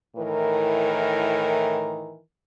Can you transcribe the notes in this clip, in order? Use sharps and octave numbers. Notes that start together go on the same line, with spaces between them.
A2 D#3 E3 A#4